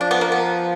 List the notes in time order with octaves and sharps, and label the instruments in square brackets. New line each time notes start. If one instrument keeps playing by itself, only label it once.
[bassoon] F3 [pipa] D4
[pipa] B3
A#3
B3